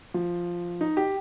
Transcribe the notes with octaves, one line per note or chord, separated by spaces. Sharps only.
F3
D#4
G4